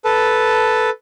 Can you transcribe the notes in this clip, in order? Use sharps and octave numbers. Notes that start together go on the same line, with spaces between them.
A4 B4 A5